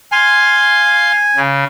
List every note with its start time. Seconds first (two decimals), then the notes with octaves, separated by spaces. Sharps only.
0.12 F5 G#5 C6
1.36 C#3